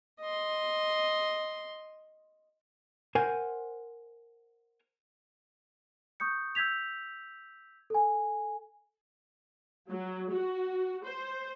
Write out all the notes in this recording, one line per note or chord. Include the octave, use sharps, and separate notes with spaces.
D#5 C6
A#4 C5 F#5 G#5
C#6 D#6 G6 C#7
E6 G6 G#6 B6 F7
A4 G#5
F#3
F#4
C5